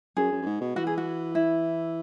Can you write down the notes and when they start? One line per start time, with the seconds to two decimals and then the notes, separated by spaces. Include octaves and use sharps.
0.17 F#2 G#4
0.32 F#2
0.42 F#2
0.46 G#2
0.61 B2
0.76 E3 F#4
0.87 G#4
0.98 F#4
1.35 E4